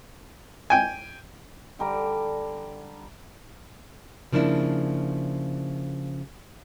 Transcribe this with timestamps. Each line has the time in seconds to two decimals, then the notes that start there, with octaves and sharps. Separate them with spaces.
0.70 G5 G#5
1.79 D3 G3 A#5 D6
4.32 C#3 F3 A#3 D4 E4